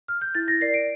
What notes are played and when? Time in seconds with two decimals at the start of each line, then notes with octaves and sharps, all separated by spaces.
0.08 F6
0.21 G6
0.35 E4 A6
0.48 A#6
0.61 A#4 D5 C7
0.74 D7